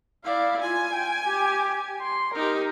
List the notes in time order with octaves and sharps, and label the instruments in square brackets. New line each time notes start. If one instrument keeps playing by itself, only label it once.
[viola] E4 D5 [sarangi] F5
[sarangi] F4 [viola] G#5
[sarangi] G5
G4
C6
[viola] D#4 G4 [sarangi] A#4